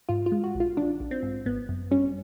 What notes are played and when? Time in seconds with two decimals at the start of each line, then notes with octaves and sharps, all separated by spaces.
0.09 G#2 F4
0.26 F4
0.32 G#3
0.44 F#4
0.55 A#1
0.60 F4
0.77 D#3 D4
1.00 A#1
1.11 C4
1.23 G#2
1.46 G#1 B3
1.69 F#2
1.91 G3 C#4